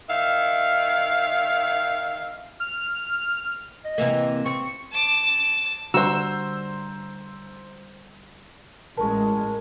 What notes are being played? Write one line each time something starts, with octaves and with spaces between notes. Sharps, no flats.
D#3 E5 F5
F6
D#5
C3 E3 A#3
C4 C#6
A5 D6
D3 G3 D4 F#4 C5 A#5 E6
A1 G#3 A#4 A5 C#6